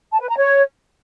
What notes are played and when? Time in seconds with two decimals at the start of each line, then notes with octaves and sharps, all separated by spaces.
0.12 A5
0.20 B4
0.29 A#5
0.38 C#5